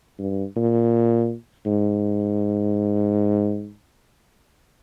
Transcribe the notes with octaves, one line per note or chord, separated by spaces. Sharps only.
G2
A#2
G#2